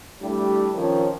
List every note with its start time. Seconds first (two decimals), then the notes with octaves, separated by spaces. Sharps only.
0.22 G3 A3 D4 E4 G4
0.74 D#3 F3 C4 C#4